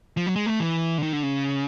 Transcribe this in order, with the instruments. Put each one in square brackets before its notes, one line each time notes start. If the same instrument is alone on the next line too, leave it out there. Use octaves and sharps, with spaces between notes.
[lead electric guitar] F3
F#3
G#3
A3
E3
D3
D#3
D3
C#3